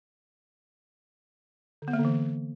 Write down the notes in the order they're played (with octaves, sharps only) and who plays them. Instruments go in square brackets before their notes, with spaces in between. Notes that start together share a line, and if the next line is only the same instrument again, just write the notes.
[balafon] D3
B3
A#3
D3
E3